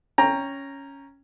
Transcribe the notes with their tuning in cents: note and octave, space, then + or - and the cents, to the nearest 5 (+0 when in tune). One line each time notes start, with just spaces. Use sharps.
C#4 +0 G5 +20 A#5 +0